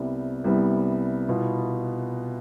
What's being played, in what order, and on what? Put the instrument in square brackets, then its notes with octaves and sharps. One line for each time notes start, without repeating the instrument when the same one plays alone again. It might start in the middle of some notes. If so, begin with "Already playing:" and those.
Already playing: [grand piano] C2 C3 G3 B3
C2 C3 G3 B3
C2 B2 B3 F4